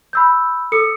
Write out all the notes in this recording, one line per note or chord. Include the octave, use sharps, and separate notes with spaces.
B5 E6 G6
A4 D#6 E6 C#7